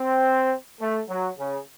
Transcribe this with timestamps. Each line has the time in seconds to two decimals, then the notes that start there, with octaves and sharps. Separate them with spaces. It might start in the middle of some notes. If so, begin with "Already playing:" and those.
Already playing: C4
0.80 A3
1.09 F#3
1.38 C#3